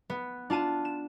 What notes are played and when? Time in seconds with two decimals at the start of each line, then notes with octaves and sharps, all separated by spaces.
0.10 B3
0.50 D4 F4 A5 D#7
0.85 E7